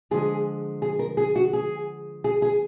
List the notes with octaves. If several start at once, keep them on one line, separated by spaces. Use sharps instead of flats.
D3 F3 G#3 G#4
G#4
A#4
G#4
F#4
G#4
G#4
G#4